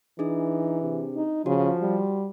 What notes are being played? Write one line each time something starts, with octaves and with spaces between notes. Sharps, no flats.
E3 D4 D#4 G#4
C3
D#4
C#3 F3 F#4
G3